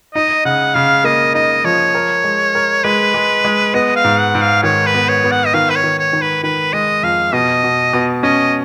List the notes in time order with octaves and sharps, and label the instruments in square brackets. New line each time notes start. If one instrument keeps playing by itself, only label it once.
[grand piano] D#4 [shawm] D#5
[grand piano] C#3 [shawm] F#5
[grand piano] C#3 [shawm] F5
[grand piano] A#3 [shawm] D#5
[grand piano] D#4 [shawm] D#5
[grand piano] F3 [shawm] C#5
[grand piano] A#4
G#3
A#4
[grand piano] G#3 [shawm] B4
[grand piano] G#3
G#3
[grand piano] B3 [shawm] D#5
[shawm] F5
[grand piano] G#2
[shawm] F#5
[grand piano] G#2
[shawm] F5
[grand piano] D#3 [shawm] C#5
[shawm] B4
[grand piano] B3
[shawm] C#5
[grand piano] B3
[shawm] F#5
D#5
[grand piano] D#3 [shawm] F5
[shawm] B4
C#5
[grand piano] D#3
[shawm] C#5
[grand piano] D#3
[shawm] B4
[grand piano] D#3 [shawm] B4
[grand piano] G#3 [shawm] D#5
[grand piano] F2 [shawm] F5
[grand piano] B2 [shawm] D#5
[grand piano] B2
B2
[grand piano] C#4 [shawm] D#5